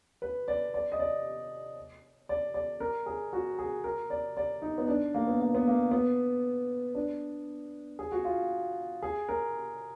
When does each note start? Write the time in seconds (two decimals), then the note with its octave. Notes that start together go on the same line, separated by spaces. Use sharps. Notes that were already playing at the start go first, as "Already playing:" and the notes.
0.22 B4
0.48 D5
0.74 D5
0.92 D#5
0.99 D5
2.29 D5
2.54 D5
2.80 A#4
3.06 G#4
3.33 F#4
3.59 G#4
3.84 A#4
4.10 D5
4.37 D5
4.62 D#4
4.78 B3
4.88 D4
5.14 A#3
5.27 B3
5.41 A#3
5.55 B3
5.68 A#3
5.91 B3
6.95 D4
7.99 G#4
8.12 F#4
8.24 F4
9.02 G#4
9.29 A#4